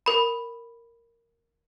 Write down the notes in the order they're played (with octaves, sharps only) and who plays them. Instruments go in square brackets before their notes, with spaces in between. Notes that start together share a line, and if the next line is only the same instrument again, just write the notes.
[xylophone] A#4 B5